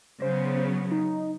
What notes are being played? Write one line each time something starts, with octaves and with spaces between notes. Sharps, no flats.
C#3 F#3 B3 C5
D#4